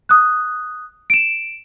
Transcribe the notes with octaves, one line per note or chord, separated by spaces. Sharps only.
D#6 F#6
D7 E7